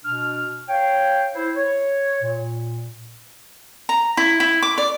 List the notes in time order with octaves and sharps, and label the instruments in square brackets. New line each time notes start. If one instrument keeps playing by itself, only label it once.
[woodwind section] B2 D4 F6
C#5 F5 G5
E4 C5
C#5
A#2
[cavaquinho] A#5
E4
E4
D6
D5